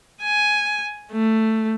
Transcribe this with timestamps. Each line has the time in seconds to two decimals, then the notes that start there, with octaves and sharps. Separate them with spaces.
0.23 G#5
1.12 A3